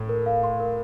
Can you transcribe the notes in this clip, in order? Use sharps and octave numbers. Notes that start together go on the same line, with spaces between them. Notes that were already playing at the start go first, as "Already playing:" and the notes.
Already playing: A2
A#4
F5
C6
A#4